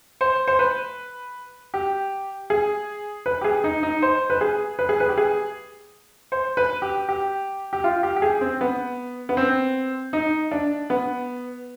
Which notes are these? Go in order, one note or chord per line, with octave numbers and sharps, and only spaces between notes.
C5
C5
B4
G4
G#4
B4
G4
G#4
D#4
D#4
C5
B4
G#4
B4
G#4
B4
G4
G#4
C5
B4
G4
G4
G4
F4
G4
G4
G#4
C4
B3
B3
C4
D#4
D4
B3